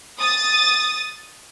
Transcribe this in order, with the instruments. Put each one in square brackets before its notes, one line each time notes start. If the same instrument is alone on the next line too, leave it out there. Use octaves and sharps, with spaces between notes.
[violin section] D#6 A6